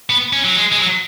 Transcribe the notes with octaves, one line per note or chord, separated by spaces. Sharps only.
B3
C#4
F#3
G#3
G#3
F#3